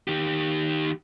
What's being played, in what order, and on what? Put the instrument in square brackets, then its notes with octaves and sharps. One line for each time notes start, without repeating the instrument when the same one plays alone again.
[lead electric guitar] D#3 G4